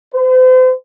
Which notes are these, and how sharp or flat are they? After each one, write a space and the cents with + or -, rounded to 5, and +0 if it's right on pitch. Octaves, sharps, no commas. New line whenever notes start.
C5 -40